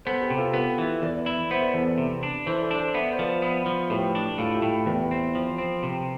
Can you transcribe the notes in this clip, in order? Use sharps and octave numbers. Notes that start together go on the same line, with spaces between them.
B3 A4 C5
G4 B4
C3
F4 A4
B3 G4 B4
E3
E2 B4 D5
E4
B3 C5 E5
B4 D5
E2 A4 C5
B4 D5
C3
D4
E3 A4 C5
D5
A4 C5
D4
A4 C5
B3 E5
D5
C5
F3 B4 D5
B3
F3
A2 G4 B4
D4
A2 F4 A4
E4 G4
A2
E2 G4 B4
C4
F3
C4
C3